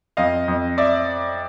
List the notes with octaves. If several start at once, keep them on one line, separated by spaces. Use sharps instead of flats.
F2 D#5 F5
F2
D5 E5